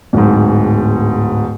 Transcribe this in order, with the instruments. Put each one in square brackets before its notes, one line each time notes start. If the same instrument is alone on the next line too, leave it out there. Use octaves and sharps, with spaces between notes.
[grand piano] D1 G#2